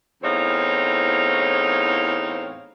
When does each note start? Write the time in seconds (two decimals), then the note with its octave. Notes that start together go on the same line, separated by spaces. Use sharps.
0.23 E2 A2 C4 D#4 C#5 F5